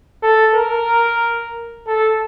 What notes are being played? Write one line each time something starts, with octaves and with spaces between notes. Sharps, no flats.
A4
A#4
A4